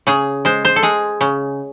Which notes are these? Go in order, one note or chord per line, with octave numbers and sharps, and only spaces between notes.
C#3 G#4
G#3 C5
C5
A4
G#3 G#4
C#3